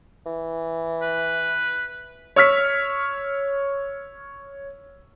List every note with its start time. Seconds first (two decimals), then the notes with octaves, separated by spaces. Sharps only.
0.26 E3
1.02 B4
2.36 C#5 E6 F6 B6